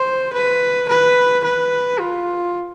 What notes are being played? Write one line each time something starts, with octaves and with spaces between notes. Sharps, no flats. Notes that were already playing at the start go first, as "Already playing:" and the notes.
Already playing: C5
B4
B4
B4
F4